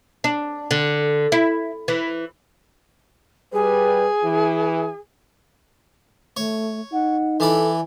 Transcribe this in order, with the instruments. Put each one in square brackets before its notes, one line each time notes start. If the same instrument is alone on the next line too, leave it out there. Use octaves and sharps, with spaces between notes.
[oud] D4
D3
E4
E3
[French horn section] G3 B4 [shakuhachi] G#4
[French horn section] E3
[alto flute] A3 [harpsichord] C#5
[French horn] D#4 [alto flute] F#5
[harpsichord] E3 D5 B5 [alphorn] A4 [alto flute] G#5